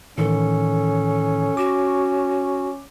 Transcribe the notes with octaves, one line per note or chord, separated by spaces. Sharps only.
A2 D#3 E3 C#4 A4
F#4 D6